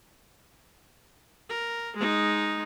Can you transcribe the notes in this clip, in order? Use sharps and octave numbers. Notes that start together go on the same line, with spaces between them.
A#4
G#3 D#4